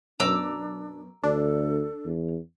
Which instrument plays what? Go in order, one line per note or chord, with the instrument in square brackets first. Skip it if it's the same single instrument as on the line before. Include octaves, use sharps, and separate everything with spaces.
[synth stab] F#2 B2 [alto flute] D4 [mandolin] A#5 D6 E6
[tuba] D2 [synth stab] D4 [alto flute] A4
[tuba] E2